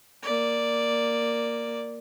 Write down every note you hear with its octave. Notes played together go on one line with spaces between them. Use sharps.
A#3 D5